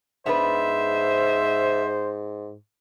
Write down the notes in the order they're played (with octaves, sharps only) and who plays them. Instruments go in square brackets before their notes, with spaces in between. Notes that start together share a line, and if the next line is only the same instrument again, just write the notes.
[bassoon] G#2 [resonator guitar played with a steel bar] B3 D4 B4 [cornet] C5 [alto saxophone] E5